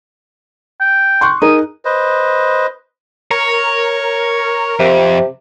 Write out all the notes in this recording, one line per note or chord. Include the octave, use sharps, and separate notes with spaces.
G5
C6 C#6 F#6
D#4 G#4 A#4 D#6
B4 C5 D#5
A#4 C#5
F2 C3